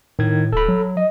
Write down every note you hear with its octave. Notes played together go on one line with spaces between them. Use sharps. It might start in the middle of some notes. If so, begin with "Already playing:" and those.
A2 D#3 G#6
D1 A4 B5
F#3
D#5